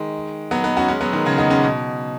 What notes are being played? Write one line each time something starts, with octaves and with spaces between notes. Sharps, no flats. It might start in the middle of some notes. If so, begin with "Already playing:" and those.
Already playing: D#3 G#3
F#3 B3
B3 D#4
C#4 F#4
G#3 C#4
F#3 B3
D#3 G#3
C#3 F#3
B3 D#4
G#3 C#4
B2